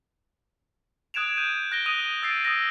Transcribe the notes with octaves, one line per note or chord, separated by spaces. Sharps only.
D#6 F#6 G#6 D7 E7 F7
G6 D#7
F#6 A#6 D7 G7
D#6 D#7 F7
E6 A6 C7 D7
D#6 E6 A6 A#6